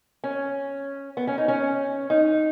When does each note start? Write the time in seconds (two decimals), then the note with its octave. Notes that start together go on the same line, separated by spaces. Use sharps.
0.24 C#4
1.17 B3
1.27 C#4
1.38 D#4
1.48 C#4
2.10 D#4